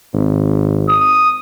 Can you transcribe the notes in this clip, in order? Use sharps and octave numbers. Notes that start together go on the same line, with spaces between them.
G#1
D#6